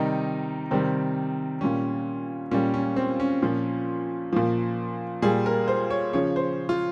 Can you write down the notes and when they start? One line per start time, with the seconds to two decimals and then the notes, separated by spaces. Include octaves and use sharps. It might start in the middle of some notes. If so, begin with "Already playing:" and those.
Already playing: C3 D#3 G3 D#4
0.71 C3 D#3 G3 C4
1.61 A#2 G3 C#4
2.51 A#2 G3 C#4
2.74 C#4
2.96 C4
3.20 C#4
3.42 A#2 F3
4.33 A#2 F3
5.22 A#2 G3 G#4
5.46 A#4
5.68 C5
5.90 C#5
6.13 C#3 F3 C#5
6.36 C5
6.69 F4